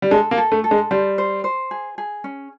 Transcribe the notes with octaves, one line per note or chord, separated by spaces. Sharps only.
G3
G#3 A4
A#3
A4
A3
A4
G#3
G3 C5
C5
C5
G#4
G#4
C#4